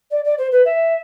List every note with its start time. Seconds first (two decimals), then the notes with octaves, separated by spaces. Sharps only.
0.11 D5
0.24 D5
0.38 C5
0.52 B4
0.65 E5